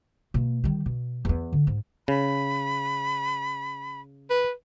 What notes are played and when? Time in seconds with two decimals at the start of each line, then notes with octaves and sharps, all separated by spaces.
0.34 B2 A#3
0.64 D#3 G3
0.86 B2
1.25 E2 B3
1.53 D3
1.67 G#2
2.08 C#3 B5
4.30 B4